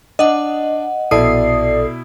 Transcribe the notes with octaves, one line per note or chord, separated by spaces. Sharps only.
D4 D#5 F#5
A#1 B2 E4 A4 D5 D#6 C7